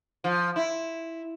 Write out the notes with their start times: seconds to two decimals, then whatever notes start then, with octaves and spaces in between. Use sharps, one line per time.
0.24 F3
0.56 E4